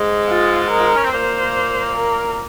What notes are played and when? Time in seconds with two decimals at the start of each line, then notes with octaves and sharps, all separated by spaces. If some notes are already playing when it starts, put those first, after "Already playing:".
Already playing: G#2 G#3
0.29 F4
0.70 A#4
0.78 F4
0.87 D#4
0.95 C#4
1.04 C4
1.12 A#2 A#3 C5
1.95 A#4